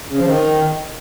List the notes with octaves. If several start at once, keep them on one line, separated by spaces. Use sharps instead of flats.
C#3
F3
D#3